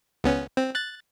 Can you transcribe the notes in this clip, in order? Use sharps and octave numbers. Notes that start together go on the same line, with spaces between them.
C#2 B3 C#4
C4
F#6 A6